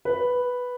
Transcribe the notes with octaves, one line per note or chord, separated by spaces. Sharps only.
B4